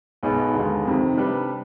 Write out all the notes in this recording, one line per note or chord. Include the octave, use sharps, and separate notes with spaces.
B1 B2 B3 D#4 G#4
D#2 D3 G#3 B3
F2 C3 D#3
C3 G3 D4 G4 B4